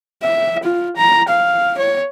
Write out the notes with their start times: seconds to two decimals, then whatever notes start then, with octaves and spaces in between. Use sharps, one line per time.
0.23 E5
0.64 F4
0.96 A#5
1.29 F5
1.78 C#5